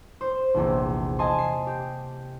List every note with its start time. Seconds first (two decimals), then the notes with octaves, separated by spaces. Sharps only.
0.21 C5
0.54 A#1 E2 C3
1.19 D#5 G#5 A5 C6
1.38 C7
1.67 G4